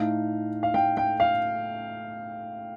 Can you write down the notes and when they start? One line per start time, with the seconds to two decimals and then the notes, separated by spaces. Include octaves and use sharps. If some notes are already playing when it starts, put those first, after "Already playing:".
Already playing: A2 A3 D#4 F5
0.63 F5
0.74 G5
0.97 G5
1.20 F5